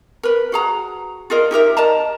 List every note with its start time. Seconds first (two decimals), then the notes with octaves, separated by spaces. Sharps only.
0.23 A#4 B4
0.52 F#4 G#4 A#5
1.30 F4 G#4 A#4 D#5
1.51 D#4 G4 A#4 E5
1.77 A#4 D#5 A5 A#5